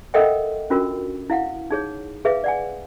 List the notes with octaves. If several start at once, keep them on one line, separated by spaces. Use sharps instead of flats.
A4 A#4 D#5 E5 F#5 G5
C#4 D4 F4 F#4 A#4
E4 F5 F#5
D#4 G#4 C#5
G#4 B4 E5 F5
D5 F#5 G#5